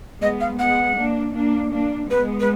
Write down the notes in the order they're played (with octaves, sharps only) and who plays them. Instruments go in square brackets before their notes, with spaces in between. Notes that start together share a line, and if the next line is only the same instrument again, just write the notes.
[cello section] G#3 B3 [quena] D#5
[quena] F5
[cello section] G#3 B3 [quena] F#5
[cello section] A#3 D4
A#3 D4
A#3 D4
[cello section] G#3 B3 [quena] B4
[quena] B4